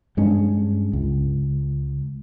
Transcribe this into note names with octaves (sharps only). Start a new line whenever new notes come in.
G2 G#3 C#4 D4
C#2